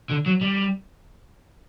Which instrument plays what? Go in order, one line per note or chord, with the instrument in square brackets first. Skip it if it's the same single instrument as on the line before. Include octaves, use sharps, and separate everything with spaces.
[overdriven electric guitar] D3
F#3
G3